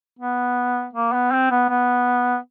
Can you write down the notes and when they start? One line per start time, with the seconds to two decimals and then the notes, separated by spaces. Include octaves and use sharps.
0.19 B3
0.93 A#3
1.13 B3
1.32 C4
1.51 B3
1.69 B3